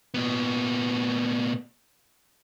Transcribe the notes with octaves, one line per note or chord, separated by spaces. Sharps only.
A#2 B3